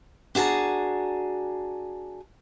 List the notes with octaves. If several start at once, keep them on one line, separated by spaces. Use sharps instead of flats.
D4 F#4 G#4 A5 A#5